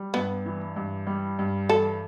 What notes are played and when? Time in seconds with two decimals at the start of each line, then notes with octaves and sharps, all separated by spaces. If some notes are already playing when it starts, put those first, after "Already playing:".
Already playing: G3
0.14 G2 B3
0.46 E3
0.76 G2
1.07 G3
1.39 G2
1.69 E3 A4